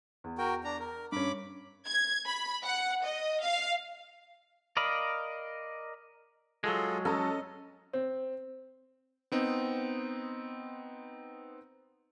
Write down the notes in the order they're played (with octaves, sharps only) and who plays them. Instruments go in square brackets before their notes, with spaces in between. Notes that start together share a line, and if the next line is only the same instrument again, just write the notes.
[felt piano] E2
[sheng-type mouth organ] F#4 A#4 G5
D4 A#5
A#4
[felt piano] G2 C#4 [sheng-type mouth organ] B5 D6
[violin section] G#6
B5
F#5
D#5
F5
[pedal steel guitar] A#4 D5 D#5 F5 B5
[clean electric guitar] F#3 G#3 [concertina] F4 G#4 A4
[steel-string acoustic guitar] C#4 [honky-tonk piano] A4 A#5 [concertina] D#5
[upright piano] C4
[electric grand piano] B3 C4 D#4